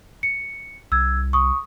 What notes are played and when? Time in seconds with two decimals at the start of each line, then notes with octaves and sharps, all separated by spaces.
0.23 C#7
0.92 C2 E6 G#6
1.33 C#6 D#6